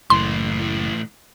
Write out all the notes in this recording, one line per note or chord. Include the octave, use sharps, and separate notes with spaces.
F#1 A2 E3 C6